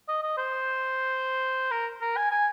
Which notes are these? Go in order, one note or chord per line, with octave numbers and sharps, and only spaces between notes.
D#5
D#5
C5
A#4
A#4
G#5
G#5